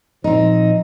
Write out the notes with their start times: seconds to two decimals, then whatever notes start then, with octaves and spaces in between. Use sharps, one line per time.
0.24 A#2 F3 C4 D#4